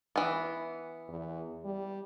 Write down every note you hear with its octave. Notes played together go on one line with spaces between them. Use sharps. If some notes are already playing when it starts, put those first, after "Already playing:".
E3 B3
E2
G3